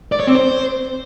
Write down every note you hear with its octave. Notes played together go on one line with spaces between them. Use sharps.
D5
C#5
C4
C5